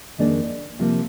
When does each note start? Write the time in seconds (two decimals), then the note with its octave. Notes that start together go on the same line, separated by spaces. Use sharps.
0.18 F2 D#3 A#3 D4 G#4
0.79 C3 F3 A#3 F4